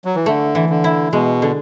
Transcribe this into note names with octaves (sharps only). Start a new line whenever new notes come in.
F#3
E3
D3 A3
E3
D3
E4
B2 G#3
D3